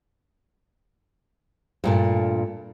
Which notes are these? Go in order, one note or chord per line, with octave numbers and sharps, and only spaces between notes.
G2 A#2 A3